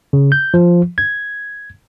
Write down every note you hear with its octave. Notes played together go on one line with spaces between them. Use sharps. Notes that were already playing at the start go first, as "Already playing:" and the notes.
C#3
G6
F3
G#6